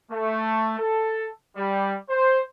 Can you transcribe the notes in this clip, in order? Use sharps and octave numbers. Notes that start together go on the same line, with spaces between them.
A3
A4
G3
C5